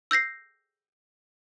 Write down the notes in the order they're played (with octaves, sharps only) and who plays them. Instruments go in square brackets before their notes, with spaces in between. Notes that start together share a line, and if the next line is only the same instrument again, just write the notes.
[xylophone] E6 G6 A#6 C7